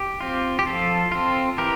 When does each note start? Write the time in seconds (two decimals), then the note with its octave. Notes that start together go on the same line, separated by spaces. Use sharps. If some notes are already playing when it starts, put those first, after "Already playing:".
Already playing: G4
0.21 C4 F4
0.59 G4
0.66 F3 F4 A4
1.12 C4 F4
1.58 E3 G4 A#4